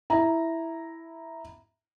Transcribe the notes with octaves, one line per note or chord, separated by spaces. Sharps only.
E4 A#5